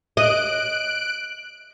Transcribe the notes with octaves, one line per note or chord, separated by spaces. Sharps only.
D#5 F#6 D7